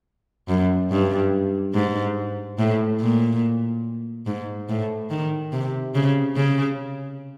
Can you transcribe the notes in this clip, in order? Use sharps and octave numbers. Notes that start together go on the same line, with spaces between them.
F#2
G2
G#2
A2
A#2
G#2
A2
D#3
C3
C#3
C#3